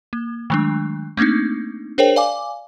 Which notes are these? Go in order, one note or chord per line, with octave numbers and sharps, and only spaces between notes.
A#3
D#3 F#3 G#3 A3 D4
A3 A#3 C4 D4 D#4
D4 G#4 A#4 C5 C#5 G5
D5 F5 G#5 D6